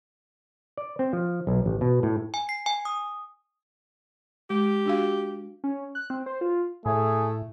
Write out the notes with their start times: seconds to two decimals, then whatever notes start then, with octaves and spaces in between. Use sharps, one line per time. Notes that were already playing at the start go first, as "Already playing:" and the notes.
0.77 D5
0.99 C4
1.13 F3
1.47 B1
1.66 A1
1.81 B2
2.03 A2
2.34 G#5
2.49 C7
2.66 G#5
2.85 D#6
4.50 G#3 G4
4.86 D4 F#4 F5
5.64 C#4
5.95 F#6
6.10 C4
6.26 C5
6.41 F4
6.86 A2 A3 G#4